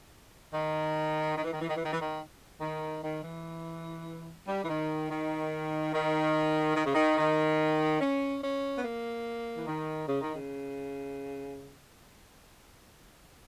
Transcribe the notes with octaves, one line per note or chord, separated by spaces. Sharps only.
D#3
D#3
E3
D#3
E3
D#3
E3
D#3
E3
D#3
D#3
D#3
E3
G3
E3
D#3
D#3
D#3
D#3
C#3
D#3
D#3
C#4
C#4
B3
A#3
E3
D#3
C#3
D#3
C#3